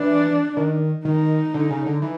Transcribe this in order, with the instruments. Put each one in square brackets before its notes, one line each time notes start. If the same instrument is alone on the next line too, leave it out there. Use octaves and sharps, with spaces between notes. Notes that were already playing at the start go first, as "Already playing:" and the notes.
Already playing: [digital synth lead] E3 [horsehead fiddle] D4
[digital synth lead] D#3
[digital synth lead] D#3 [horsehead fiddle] D#4
[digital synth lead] D3
C#3
D3
E3